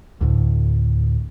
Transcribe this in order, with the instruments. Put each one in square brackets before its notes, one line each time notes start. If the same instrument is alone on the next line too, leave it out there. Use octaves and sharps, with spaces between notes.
[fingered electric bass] D2 A2 D3